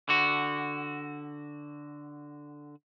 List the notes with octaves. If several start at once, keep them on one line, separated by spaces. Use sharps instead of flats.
D3 F#4